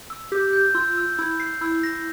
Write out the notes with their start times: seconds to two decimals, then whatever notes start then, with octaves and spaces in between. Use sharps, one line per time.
0.10 E6
0.32 G4 G6
0.53 G6
0.75 F4 E6
0.97 E6
1.19 E4 E6
1.40 C7
1.61 E4 E6
1.83 A#6